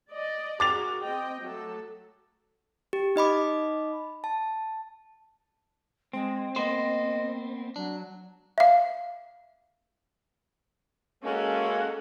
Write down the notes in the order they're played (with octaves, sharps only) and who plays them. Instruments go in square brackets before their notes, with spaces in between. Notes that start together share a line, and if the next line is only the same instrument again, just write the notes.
[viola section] D5 D#5
[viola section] F#4 G#4 A#4 [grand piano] D6 A6 F7
[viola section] C4 D#5 G5
F#3 A3 A4
[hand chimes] G4
D#4 D#5 B5 D6
A5
[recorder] G#3 [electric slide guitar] C4
[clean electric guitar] A#3 B3 C5 [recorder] D#5
[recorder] F#3 [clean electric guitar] D4
[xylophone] E5 F5
[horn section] G#3 A#3 F#4 [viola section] C#4 A4